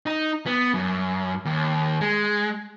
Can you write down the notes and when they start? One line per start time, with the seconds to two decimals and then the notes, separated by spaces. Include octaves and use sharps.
0.06 D#4
0.46 B3
0.74 F#2
1.45 D#2
2.01 G#3